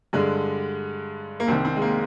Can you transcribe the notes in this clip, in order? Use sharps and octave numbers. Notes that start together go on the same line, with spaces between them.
G2 D3 G#3
A#3
C2 C3 D#3 C4
C4
G#3
A#3